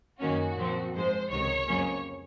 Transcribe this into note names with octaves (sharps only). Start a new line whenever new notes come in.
F#2 D#3 A#3 C#4 F#4
A#2 F3 C4
G#2 F3 G#3 C5
C#2 C3 D#3 C#5
F2 C#3 F#3 A#3 C#4